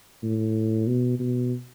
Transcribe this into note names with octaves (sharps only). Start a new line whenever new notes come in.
A2
B2
B2